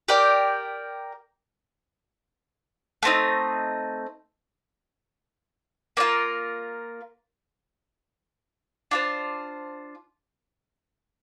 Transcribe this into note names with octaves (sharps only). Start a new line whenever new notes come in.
G4 A#4 D5 G5
A3 C4 D#4
A#3 D4 F4 A#4
D4 F4 C5